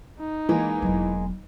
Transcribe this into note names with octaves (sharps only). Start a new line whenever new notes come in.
D#4
E3 G#3 A#3
E1 F#3